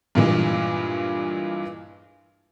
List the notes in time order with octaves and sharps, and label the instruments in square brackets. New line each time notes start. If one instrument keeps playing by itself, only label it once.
[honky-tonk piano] G2 A#2 E3 G#3